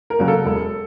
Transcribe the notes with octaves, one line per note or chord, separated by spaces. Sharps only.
A#4
C#3 F#3 A#3
A4
E1